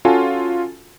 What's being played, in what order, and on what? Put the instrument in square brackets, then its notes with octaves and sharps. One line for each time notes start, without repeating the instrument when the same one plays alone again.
[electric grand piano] C#4 F4 F#4 A4 G#5 A5